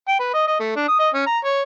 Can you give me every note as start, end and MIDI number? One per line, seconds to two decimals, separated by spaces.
0.08 0.16 79
0.20 0.34 71
0.34 0.47 75
0.47 0.56 75
0.59 0.75 57
0.76 0.84 62
0.88 0.95 87
0.99 1.09 75
1.14 1.25 61
1.26 1.38 82
1.45 1.61 73